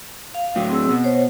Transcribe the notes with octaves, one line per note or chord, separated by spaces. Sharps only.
F5
A2 F#3
C4 G#4 E6
B2
C5 C#5